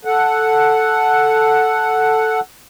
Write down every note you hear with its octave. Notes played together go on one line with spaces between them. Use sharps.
A4 F#5